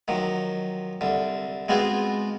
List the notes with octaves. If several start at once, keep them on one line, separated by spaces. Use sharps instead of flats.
D#3 F3 F#3
C2 D3
G#3 B3 C4 F4 F#4 G#4